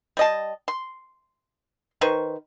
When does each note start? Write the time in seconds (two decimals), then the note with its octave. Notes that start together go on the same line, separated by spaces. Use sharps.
0.17 G3 D#5 A5
0.68 C6
2.01 D#3 B4 C5 C#6